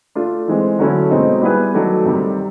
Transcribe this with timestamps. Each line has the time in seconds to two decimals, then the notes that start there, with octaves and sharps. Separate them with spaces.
0.15 A3 D4 F4
0.48 E3 G#3 C4
0.79 D3 F#3 A3 C#4 E4
1.11 B2 G#3 C4 D#4
1.42 G3 B3 E4 G#4 B4
1.74 D#3 F#3 A3 D4
2.05 C3 D#3 G3